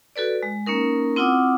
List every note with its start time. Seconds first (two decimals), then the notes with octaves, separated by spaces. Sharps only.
0.16 F#4 A4 B4 D5
0.43 G#3
0.66 A#3 C#4 D#4 A#4
1.16 C4 E4 F4 F#5 D6 D#6